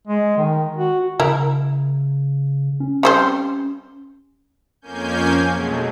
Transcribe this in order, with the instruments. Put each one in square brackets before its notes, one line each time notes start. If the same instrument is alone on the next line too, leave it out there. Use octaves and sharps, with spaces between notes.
[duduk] G#3
D#3
F#4
[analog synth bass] C#3 [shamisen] E4 A#4
[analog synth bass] C#4
[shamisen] G3 C4 C5
[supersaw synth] F2 A#3 C#4 G#5 G6
B2 F#3 G#3 A3